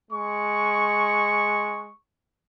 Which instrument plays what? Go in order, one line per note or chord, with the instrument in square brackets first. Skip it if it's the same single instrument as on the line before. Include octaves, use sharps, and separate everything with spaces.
[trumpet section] G#3 C#6